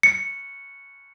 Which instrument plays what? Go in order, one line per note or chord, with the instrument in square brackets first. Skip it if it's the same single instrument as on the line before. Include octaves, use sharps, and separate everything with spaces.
[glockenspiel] C#7